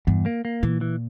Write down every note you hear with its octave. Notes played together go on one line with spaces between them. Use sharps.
E2 G2
A#3
A#3
A#2 E3
E3